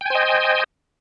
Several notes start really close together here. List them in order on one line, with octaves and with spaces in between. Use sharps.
G5 G#5 C5 D#5